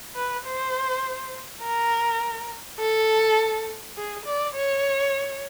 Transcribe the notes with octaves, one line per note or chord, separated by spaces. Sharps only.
B4
C5
A#4
A4
G#4
D5
C#5